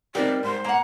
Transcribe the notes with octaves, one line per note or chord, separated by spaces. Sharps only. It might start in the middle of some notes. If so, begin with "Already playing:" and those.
G3 C4 D#4 G4 A#4 D5
G#2 C5
A#3 F#5 A#5